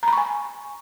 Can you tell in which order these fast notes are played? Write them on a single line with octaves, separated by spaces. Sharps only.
A#5 B5 C#6 G#5